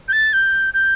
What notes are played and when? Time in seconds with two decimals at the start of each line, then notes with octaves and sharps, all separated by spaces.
0.08 G6
0.13 A6
0.33 G6
0.74 G6